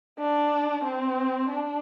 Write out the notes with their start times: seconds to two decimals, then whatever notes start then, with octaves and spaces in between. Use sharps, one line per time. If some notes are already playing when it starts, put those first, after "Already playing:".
0.19 D4
0.84 C4
1.49 D4